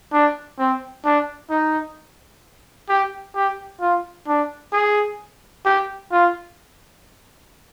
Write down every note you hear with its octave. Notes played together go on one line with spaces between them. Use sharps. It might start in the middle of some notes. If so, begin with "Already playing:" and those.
D4
C4
D4
D#4
G4
G4
F4
D4
G#4
G4
F4